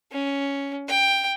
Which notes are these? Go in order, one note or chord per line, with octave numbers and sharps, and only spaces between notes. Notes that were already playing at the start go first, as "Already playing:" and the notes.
C#4
G5